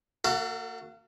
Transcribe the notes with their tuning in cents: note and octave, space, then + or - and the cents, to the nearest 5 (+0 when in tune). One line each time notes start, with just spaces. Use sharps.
A#3 -35 F#4 +0 A4 +30